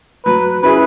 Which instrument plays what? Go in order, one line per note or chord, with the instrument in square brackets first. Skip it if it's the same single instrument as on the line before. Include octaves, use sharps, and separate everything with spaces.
[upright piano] F#3 [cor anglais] B4
[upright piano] C#4 E4 G#4 [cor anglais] B4